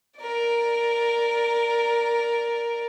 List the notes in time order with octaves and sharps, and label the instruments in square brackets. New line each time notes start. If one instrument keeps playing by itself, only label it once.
[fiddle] A#4 D5